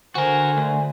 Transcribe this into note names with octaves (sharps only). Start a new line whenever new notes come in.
D3 F#4 A#4 C5 G#5
D2